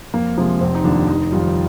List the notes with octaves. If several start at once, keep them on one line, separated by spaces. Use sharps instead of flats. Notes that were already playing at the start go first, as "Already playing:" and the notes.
F2 A#3
C3 F3 G#3 A#3
F1 C4
D#4
D#2 D3 F3 D4
F1 D#4
F2 D#3 G3 F4